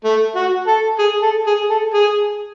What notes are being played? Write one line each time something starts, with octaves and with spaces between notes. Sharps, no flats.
A3
F#4
A4
G#4
A4
G#4
A4
G#4